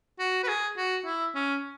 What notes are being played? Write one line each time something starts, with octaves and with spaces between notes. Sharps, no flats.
F#4
B4
G#4
F#4
E4
C#4